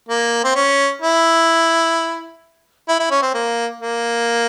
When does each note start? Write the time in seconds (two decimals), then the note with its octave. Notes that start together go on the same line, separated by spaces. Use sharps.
0.09 A#3
0.44 C4
0.55 C#4
1.02 E4
2.88 E4
2.99 E4
3.10 C#4
3.22 C4
3.34 A#3
3.80 A#3